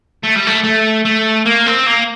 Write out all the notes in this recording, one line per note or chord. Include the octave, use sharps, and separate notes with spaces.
A3
G3
A3
A3
A3
A#3
C4
A#3